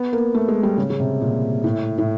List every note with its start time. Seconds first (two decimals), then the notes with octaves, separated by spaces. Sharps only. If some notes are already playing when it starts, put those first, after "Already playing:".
Already playing: B3
0.13 A#3
0.34 A3
0.48 G#3
0.63 G3
0.78 C#3
0.90 C#3
1.00 C3
1.21 A#2
1.64 A2
1.98 A2